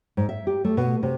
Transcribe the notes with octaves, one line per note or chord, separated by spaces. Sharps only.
G#2
E5
G4
A3
B2
C3